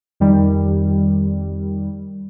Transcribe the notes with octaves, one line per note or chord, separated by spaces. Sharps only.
F2 D#3 G3